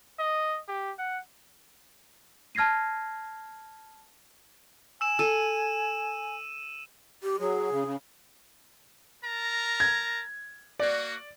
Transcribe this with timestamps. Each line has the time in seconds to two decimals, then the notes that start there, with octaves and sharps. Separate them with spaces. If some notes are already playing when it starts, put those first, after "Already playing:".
0.19 D#5
0.68 G4
0.99 F#5
2.55 A5 F6 G#6 A#6 C7 D#7
5.01 G#5 E6 E7
5.19 A4 E6 D#7
7.23 G4
7.40 F#3 G#4
7.71 C#3
7.85 C#3
9.23 A#4 A5 A#5
9.80 G#6
10.79 A#3 F#4 D5